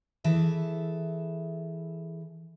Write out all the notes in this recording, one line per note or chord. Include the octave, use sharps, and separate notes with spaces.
E3 G#4 A4 E5